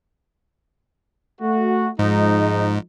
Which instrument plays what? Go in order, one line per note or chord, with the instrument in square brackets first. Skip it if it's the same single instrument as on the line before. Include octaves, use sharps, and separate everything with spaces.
[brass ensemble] A3 F#4
[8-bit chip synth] G#2 [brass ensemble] F3 G#3 D#4